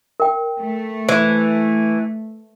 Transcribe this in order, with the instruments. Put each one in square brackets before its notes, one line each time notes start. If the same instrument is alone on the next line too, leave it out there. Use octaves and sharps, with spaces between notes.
[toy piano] A#4 G5
[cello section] A3
[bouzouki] E3 [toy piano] C5